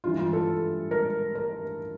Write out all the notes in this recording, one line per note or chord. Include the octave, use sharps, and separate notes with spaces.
G2 E3 F4
F4
A4
A#4
A#4